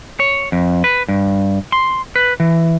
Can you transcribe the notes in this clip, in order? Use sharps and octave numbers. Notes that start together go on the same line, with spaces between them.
C#5
F2
B4
G2
C6
B4
E3